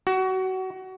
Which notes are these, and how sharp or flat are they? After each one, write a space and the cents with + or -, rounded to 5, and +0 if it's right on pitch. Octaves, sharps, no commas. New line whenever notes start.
F#4 +25